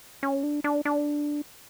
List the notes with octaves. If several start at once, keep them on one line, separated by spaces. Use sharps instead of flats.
C#4
D4
D4
D4